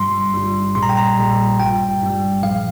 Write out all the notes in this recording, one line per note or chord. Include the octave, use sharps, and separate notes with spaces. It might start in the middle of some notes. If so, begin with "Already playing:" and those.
Already playing: G1 G2 G3 C6
G1 G2 G3
A#1 A#2 G3 C6
A#5
G5
A#5
A#1 A#2 G3
G1 G2 G3 G5
G1 G2 G3
A#1 A#2 F3 F5